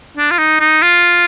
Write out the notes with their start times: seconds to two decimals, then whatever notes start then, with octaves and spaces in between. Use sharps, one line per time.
0.17 D4
0.31 F4
0.38 D#4
0.60 D#4
0.82 F4